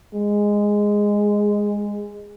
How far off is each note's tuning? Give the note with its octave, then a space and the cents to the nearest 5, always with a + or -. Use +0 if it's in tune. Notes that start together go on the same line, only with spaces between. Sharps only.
G#3 -10